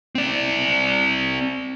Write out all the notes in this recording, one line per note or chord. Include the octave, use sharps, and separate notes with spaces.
C4 D5